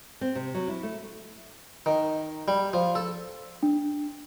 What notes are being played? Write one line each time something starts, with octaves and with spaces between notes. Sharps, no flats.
C4
C3
F#3
E4
A3
D#3
G3
F3
A4
D4